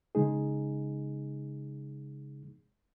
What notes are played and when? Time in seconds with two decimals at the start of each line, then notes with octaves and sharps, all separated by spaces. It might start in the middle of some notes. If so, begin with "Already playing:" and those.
0.15 C#3 G#3 D#4 G#4